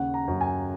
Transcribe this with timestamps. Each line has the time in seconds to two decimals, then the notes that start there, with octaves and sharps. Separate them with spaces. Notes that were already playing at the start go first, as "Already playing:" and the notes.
Already playing: D#2 C#3 F#5
0.14 A#5
0.28 F#2
0.41 G#5